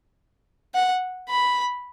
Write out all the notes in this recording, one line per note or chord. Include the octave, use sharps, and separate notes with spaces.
F#5
B5